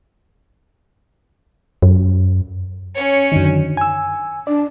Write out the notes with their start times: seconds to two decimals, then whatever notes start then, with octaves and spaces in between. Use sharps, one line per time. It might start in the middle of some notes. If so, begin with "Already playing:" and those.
1.82 F#2
2.95 C#4 C#5
3.32 F#2 D3 D#3
3.77 G#5 E6
4.47 D4 D5